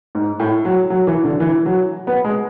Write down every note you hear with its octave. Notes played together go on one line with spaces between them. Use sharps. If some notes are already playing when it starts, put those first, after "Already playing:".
G#2
A2
F#3
F#3
E3
D3
E3
F#3
B3
G#3